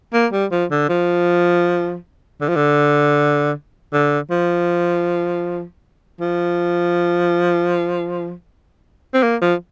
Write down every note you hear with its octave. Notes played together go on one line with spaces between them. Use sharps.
A#3
G3
F3
D3
F3
D3
F3
D3
D3
F3
F3
C4
A#3
F3